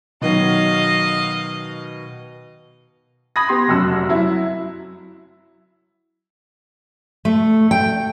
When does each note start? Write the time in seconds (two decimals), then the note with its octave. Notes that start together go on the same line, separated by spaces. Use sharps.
0.21 B2 D#3 F#3 D#5 F5
3.36 B5 D#6 G#6 A#6
3.49 B3 G4 C6
3.68 F1 F#2 F#4 E6
4.09 F#3 E4
7.25 A3
7.71 G5